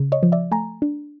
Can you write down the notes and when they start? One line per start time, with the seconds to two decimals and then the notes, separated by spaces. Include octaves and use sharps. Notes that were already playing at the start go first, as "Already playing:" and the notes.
Already playing: C#3
0.12 C#5 D#5
0.23 F3
0.32 D5 E5
0.51 A3 G#5 A#5
0.82 D4